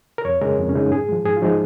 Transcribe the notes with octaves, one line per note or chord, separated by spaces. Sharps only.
A#4
F2 C#5
C#3 G#3 A#4
F2
C#4
C#3 G#3 D#4
G#2 G#4
F3 G#3
G#2 G#4
F4
F3 G#3 D#4